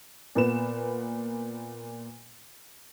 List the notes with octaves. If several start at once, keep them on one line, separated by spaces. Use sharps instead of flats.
A#2 B3 B4 E7